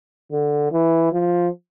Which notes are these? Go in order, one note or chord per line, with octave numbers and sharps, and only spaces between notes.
D3
E3
F3